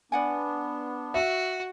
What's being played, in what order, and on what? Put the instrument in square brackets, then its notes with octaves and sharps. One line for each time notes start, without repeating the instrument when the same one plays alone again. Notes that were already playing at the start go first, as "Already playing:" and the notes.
[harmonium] B3 D4 [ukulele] D5 F#5 G#5
[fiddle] F#4 [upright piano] E5